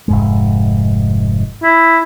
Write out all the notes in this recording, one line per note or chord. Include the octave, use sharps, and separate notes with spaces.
F1 G#2 G#3
E4